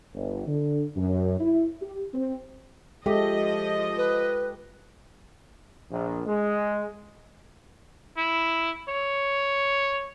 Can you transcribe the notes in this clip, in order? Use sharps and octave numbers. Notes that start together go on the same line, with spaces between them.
G1
D3
F#2
E4
G4
C4
F3 G#3 G4 A4 D#5 E5
B4
A#1
G#3
E4
C#5